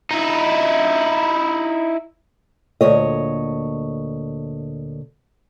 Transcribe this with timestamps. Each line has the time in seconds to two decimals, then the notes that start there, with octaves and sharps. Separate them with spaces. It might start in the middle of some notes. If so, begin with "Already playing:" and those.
0.11 D#4 E4
2.81 D2 A#2 C#5 D#5